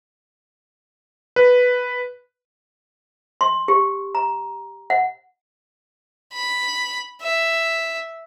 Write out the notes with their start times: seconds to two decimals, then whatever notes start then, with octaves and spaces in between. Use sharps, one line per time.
1.36 B4
3.41 C6
3.68 G4
4.15 A#5
4.90 F#5
6.33 B5
7.21 E5